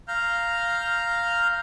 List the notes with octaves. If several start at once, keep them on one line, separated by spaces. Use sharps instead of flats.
F5 A#5 F6 G6